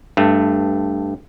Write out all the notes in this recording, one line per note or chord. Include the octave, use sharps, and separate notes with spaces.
G2 A3